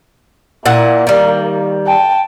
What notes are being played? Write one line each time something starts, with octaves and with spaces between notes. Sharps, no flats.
A#2 A#3 E4 F#5
D#3 G3
G5 A5